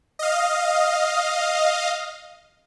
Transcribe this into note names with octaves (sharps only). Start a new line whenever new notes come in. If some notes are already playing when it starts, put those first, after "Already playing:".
D#5 F5